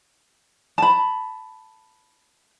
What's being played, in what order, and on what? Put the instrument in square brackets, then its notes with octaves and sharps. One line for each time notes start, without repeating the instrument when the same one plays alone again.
[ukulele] A5 B5